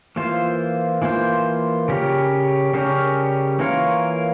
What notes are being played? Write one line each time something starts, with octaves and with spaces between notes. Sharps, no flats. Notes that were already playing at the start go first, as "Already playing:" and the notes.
E3 A#3 F4 C5
E3 A#3 F4 C5
C#3 G3 C#4 G4 A#4
C#3 G3 C#4 G4 A#4
E3 A#3 F4 A#4 C#5